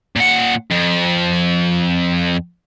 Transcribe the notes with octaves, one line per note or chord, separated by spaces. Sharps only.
A#2 F#5
F2